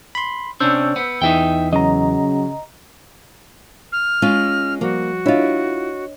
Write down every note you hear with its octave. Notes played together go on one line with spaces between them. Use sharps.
B5 C6
C3 C#4 D4 C5 E6 G6
B3
E2 E3 D#4 E5 G5
C#3 F#3 D#5 A#5
F6
G#3 C#4 F4
F3 G3 A#3 F#4
D4 E4 F4 C#5 D#5